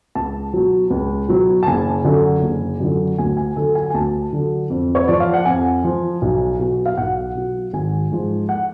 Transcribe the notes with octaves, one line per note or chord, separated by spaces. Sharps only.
C#2 A5
B2 F#3
C#2
B2 F#3
A5
F#1 G#5
F#2 D3 F#3
F#1
F#2 D3 F#3
D2 G#5
G#5
D3 F#3 A4
G#5
G#5
D2 A5
D3 F#3
F2
C#5
F3 D5
F5
F#5
F2 G#5
F3
B1
B2 F#3
F5
B1 F#5
B2 F#3
G#1 G#5
G#2 F3
F#5